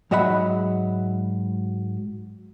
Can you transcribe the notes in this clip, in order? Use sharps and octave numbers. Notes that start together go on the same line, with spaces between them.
G#2 F#3 D#5 E5 F#5 B5